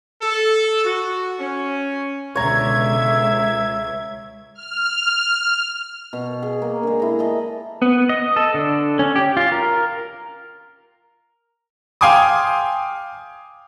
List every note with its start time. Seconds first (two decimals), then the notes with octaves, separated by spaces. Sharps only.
0.22 A4
0.85 F#4
1.40 C#4
2.35 C#2 B2 D3 C#5 E5 A#5 G#6
4.54 F6
6.13 B2
6.42 G#4
6.62 A#3
6.83 D3 G#3
7.00 E4 A#5
7.19 D5 D#5 A5 A#5
7.82 B3
8.09 D#5
8.36 A4
8.54 D3
8.99 C#4
9.16 G4
9.37 F4
9.52 A#4
12.01 F5 G5 G#5 C6 D6 D#6